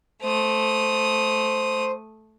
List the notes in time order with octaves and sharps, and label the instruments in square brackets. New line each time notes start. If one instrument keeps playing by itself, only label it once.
[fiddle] A3 D#6 [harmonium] C5